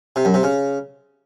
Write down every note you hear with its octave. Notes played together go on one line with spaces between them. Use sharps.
C3
F#2
C3
C#3